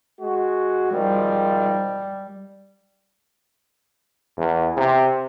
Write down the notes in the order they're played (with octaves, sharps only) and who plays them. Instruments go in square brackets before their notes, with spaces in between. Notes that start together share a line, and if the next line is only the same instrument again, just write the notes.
[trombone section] G#3 F#4
[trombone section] G#1 D#3 F3 [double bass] G3
[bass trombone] E2
C3